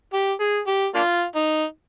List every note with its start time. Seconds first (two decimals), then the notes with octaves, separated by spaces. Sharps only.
0.13 G4
0.40 G#4
0.67 G4
0.94 A#3 D4 F4
1.35 D#4